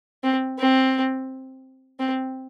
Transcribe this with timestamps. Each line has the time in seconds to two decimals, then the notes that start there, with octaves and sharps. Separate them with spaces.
0.23 C4
0.58 C4
1.99 C4